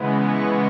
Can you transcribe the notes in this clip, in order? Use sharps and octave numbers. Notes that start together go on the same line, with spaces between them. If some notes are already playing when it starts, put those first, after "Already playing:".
Already playing: C#3 E3 G#3 B3
C#6